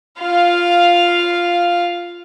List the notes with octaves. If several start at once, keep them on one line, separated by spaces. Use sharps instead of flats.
F4 F5